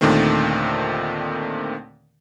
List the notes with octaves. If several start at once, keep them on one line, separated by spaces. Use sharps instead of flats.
D#2 A#2 D3 D#3 A3 C4